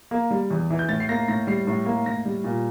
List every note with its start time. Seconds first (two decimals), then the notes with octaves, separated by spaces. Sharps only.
0.11 A#3
0.31 G3
0.50 E2
0.70 E3
0.79 G6
0.89 A2 A6
1.00 C7
1.09 A#3 A#6
1.28 A2 A#6
1.47 G3 C7
1.67 A2
1.86 A#3
2.06 A2 A#6
2.25 G3
2.44 A#2